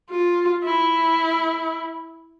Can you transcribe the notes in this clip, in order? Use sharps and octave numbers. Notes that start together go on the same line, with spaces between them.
F4
E4